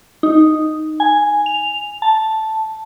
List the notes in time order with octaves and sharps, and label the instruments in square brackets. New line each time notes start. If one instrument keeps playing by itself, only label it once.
[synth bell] D#4
G#5
F7
A5